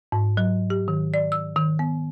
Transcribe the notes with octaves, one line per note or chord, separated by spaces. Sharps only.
G#2
F#3
G4
D#3
D5
E6
D#3
B3